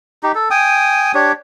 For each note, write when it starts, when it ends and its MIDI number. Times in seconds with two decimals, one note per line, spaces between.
0.23 0.32 63
0.23 0.32 67
0.35 0.48 69
0.51 1.12 79
0.51 1.12 80
0.51 1.12 87
1.14 1.32 62
1.14 1.32 67
1.14 1.32 73